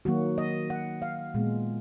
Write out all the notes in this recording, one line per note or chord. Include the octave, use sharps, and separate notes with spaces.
D#3 F#3 A#3 F#4
D#5
F#5
F5
A#2 G#3 B3